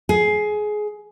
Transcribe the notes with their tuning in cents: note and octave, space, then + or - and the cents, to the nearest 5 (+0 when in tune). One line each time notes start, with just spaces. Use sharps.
G#4 +20